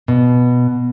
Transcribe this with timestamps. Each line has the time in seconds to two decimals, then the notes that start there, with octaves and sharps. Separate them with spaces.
0.08 B2